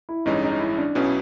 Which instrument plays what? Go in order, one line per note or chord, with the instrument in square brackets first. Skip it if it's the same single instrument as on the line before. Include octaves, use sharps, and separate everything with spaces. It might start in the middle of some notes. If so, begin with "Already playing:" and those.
[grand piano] E4
[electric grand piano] A1 G2 E3 G#3 C#4 [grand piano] D#4
[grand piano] D#4
E4
D4
[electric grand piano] B1 B2 F#3 B3 E4 [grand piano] C#4